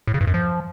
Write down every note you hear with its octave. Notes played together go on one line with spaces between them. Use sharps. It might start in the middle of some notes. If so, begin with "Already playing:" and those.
A2
C#3
G2
F#2
F3